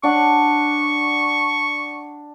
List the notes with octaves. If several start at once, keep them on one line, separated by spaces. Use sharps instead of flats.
D4 F#5 C#6